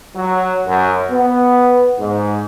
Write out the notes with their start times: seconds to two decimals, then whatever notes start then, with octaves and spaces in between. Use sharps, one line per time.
0.15 F#3
0.67 F#2
1.11 B3
2.00 G#2